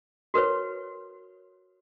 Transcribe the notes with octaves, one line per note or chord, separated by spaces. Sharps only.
F#4 A#4 B4 C#5